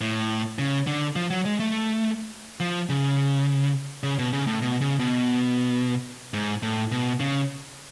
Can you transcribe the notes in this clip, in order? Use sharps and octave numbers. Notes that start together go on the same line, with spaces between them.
A2
C#3
D3
F3
F#3
G#3
A3
F3
C#3
C#3
B2
C#3
A2
B2
C#3
B2
G#2
A2
B2
C#3